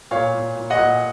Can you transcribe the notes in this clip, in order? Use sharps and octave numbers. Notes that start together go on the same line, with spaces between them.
A#2 C#5 F5
A#2
A#2
D#5 F#5
A#2